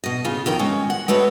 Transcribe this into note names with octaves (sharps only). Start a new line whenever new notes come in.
B2 D#5
C#3 F4
F2 D#3 G5 A#5
G#3 C#4
F#5
G#3 A3 B3 F#4 C#5